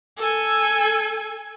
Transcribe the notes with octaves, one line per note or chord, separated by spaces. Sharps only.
A4 G#5